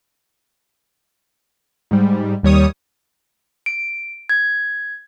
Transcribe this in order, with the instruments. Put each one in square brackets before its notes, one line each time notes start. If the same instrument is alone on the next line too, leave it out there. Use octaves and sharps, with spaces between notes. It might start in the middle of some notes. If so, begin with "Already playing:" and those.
[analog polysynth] G#2 G3
D#2 G3 C#5 D#6
[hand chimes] D7
G#6